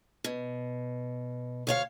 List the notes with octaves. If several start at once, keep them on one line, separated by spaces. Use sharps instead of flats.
B2
D2 C#5 F5